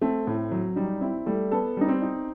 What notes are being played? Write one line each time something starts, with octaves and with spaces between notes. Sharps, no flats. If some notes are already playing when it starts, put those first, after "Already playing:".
A3 C4
A2
F#3
G3 D#4
C4 E4
G3 A3
B3 A4
G3 D#4
C4
D#4